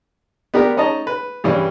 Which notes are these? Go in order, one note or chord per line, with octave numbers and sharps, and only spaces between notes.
B3 D4 G4 A#4
C#4 D#4 D#5 A5 A#5
B4
G2 E3 G3 C#4